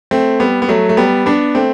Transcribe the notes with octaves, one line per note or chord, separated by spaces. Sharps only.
A3 C4
G3 B3
B3
F#3 A3
A3
G3 B3
B3 D4
A3 C4